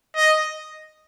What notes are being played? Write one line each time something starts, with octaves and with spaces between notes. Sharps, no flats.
D#5